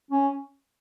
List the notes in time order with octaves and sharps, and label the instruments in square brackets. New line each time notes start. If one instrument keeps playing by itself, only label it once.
[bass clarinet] C#4